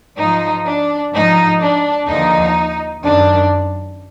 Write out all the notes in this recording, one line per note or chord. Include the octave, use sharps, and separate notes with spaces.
G#2 F3 D#4
D4
G#2 F3 D#4
D4
D#2 D3 F3 D#4
F#2 D#3 D4